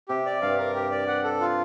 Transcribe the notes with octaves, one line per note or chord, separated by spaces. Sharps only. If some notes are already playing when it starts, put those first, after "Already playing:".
C3 G4
D5
G2 F5
A#4
G4
D5
F#5
A4
F4